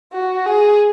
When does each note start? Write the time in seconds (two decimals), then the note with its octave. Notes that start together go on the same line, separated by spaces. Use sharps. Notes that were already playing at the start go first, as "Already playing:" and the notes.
0.13 F#4
0.46 G#4